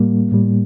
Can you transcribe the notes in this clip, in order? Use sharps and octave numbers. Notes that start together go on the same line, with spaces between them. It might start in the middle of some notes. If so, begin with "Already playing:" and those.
Already playing: A2 G3 A#3
A2 G3